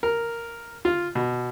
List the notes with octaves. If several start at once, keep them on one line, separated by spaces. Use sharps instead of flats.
A#4
F4
B2